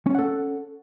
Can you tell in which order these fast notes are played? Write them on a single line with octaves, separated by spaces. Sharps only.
C#4 C#5 F#5 A4